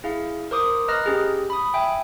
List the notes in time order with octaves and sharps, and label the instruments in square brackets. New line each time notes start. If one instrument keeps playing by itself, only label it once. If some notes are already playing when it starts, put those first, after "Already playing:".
[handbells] E4 G#4 F5
A#4 C5 D6 D#6
B4 D#5 A#5 F6 F#6 A#6
C#4 G4 G#4
B5 D#6
E5 G5 G#5